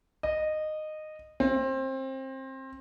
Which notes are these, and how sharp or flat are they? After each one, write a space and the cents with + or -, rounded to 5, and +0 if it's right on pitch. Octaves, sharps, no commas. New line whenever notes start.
D#5 -15
C4 +25